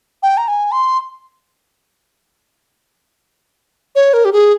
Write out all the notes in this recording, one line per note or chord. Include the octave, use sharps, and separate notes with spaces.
G5
A#5
G#5
C6
C#5
A#4
G4
G#4